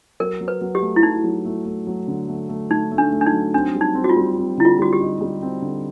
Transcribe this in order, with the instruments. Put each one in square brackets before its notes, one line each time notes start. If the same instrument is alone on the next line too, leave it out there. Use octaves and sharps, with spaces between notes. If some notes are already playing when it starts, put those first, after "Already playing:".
[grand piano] F#3 [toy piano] A#4
[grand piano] F#3
[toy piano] B4
[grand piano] F#3
[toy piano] G4
[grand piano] A3
[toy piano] E4
[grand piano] F#3 [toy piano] D#4
[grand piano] F#3
A3
A3
F#3
D3
A3
A3
[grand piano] A3 [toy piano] D#4
[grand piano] A3
[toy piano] D4
[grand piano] A3
[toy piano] D4
D#4
[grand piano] F#3
[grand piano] C4 [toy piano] D4
[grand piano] G3
[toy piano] D#4
[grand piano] C4
[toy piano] F#4
F4
[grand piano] G3
C4
[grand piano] D3 [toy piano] E4
[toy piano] F4
[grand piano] G3 [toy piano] F#4
[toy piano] G4
[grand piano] D#4
G3
C4
D3